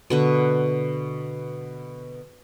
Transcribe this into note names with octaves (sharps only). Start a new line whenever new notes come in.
B2 D3 B4